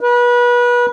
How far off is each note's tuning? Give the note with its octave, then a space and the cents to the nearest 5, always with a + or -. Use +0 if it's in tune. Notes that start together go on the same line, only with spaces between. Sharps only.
B4 -30